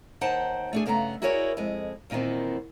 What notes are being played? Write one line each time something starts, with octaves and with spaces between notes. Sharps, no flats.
D#2 D#4 C5 F#5 G5 A5
A3 D4 G#4
G2 C#3 A3 B3 G#5 A#5
E4 F#4 G#4 A#4 C#5 D5
F2 G#3
E2 A#2 D#3 B3 C4